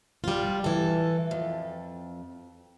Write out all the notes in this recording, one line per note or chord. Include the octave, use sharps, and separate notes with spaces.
G3 F4
E3 A4
F2